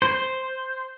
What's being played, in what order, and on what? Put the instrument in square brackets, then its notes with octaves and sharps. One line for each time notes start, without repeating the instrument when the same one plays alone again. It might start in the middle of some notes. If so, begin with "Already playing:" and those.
[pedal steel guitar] C5